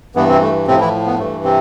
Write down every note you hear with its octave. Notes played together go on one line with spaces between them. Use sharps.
G2 E3 B3
C3 C4
A3
A2 C3 F3 C4
E3 E4
B3
G2 E3 A3
C3 C4